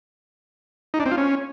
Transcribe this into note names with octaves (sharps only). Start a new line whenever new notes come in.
D#4
D4
C4
F4
C#4